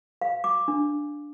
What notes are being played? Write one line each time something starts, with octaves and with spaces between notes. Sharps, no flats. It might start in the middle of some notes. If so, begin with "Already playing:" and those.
F5
D6
D4